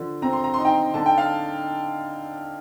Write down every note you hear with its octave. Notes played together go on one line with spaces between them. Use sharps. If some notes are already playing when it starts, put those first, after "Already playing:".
Already playing: D3 F3
C4 A#5
C6
A#5
D#4 C6
G5 A#5
D3 A5
G5
F5 A5